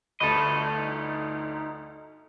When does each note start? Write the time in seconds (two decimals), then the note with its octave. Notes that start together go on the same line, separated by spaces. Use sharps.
0.20 G1 D2 A4 D#5 B5 E7
0.76 D#4